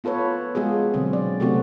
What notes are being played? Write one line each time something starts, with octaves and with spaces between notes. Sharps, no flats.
B3 F4 A4 B4 C#5
G#3 B3 F4 F#4 G#4
B2 D3 F#3 C4
D5
C3 A3 B3 C4 F#4